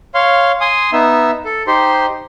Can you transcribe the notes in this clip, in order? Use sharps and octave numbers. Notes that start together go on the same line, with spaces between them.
C#5 F5 C6
G#5 C6 D#6
B3 D#4 E5
A4
D#4 G4 C5 C6